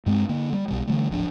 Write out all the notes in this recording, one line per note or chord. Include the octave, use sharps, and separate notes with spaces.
G2 G#3 C4
D3 A#3
G3
B1 B2 G3
D3 E3 G3 A3
D1 G#1 F3 D4